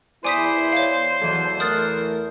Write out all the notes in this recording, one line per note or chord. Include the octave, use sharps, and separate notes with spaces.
E2 E4 C5 D5 G#5 B5 D#6 B6
C#5 F5
E2 B2 E3 F#3 A4
E3 A3 A#4 D#6 F6 F#6 A6